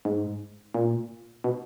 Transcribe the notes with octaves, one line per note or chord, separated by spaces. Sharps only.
G#2
A#2
B2